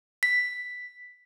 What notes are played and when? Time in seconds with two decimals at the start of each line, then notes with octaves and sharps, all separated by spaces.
0.23 B6